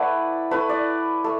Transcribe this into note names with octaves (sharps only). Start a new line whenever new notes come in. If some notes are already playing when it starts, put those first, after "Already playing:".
Already playing: A3 E4 B4 D5 F#5
A3 E4 B4
D5
A3